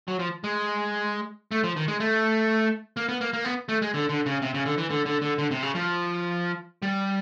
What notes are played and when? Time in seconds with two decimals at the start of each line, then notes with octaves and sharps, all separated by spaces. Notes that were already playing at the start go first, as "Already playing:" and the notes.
0.08 F#3
0.19 F3
0.44 G#3
1.52 A3
1.63 F3
1.76 D#3
1.88 G#3
2.00 A3
2.97 A#3
3.09 B3
3.21 A#3
3.33 A#3
3.44 B3
3.69 A3
3.82 G#3
3.94 D3
4.09 D3
4.26 C#3
4.42 C3
4.54 C#3
4.66 D3
4.78 E3
4.90 D3
5.06 D3
5.22 D3
5.38 D3
5.51 C3
5.63 C#3
5.75 F3
6.82 G3